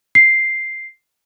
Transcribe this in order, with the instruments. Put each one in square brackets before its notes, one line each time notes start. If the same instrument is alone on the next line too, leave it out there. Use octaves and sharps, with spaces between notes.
[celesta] C7